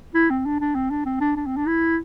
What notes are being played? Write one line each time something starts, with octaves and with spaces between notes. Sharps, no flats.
E4
C4
D4
D4
C4
D4
C4
D4
D4
C4
D4
E4